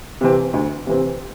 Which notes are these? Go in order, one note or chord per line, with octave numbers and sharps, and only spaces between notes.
C3 E3 C4
D2
C3 E3 C4